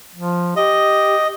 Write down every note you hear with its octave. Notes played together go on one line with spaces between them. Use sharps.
F3
G4 D#5